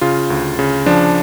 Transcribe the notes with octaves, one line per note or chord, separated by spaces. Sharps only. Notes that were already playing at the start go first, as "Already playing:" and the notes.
C#3 F4
D2
C#3
F3 D4